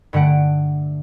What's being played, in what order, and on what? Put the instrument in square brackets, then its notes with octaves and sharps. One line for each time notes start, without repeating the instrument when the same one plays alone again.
[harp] G2 D3 A3 F#5 D7